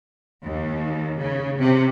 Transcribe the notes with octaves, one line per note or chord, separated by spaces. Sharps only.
D#2
C#3
C3